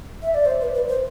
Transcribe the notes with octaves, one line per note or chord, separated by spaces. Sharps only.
E5
D5
C5
B4
B4
C5